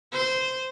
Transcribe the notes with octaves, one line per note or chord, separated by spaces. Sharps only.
C5